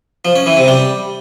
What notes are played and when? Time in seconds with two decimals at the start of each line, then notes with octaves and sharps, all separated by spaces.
0.25 F3
0.36 C#4
0.46 E3
0.57 C3
0.68 G3